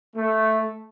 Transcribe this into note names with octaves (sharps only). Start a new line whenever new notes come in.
A3